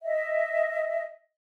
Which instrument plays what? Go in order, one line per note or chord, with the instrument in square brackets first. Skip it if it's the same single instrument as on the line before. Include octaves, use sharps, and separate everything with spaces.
[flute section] D#5 E5